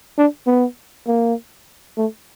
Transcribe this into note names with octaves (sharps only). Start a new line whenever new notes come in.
D4
B3
A#3
A3